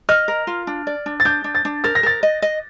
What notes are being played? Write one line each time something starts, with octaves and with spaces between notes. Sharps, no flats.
D#5 F6
A#4
F4
D4
D5
D4
A6
D4 G6
D4
A6
D4
A#4 A6
A#6
A#4 A6
D#5
D#5